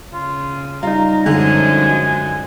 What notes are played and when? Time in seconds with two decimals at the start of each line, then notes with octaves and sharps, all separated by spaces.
0.13 C#3 F4
0.83 G3 D#4 F4 A#5
1.26 F#2 D3 F3 G#3 G#5